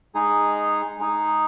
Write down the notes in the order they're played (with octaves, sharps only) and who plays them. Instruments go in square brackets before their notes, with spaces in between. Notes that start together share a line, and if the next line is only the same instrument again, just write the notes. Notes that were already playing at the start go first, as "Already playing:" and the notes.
[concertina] G#3 D#4 G#4
G#3 D#4 G#4